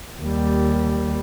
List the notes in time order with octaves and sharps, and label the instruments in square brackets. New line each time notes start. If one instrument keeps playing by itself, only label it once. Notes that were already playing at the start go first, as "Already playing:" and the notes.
[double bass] D#2 G3